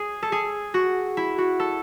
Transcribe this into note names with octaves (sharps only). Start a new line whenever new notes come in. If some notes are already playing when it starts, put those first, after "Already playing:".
Already playing: G#4
A4
G#4
F#4
E4
F#4
A4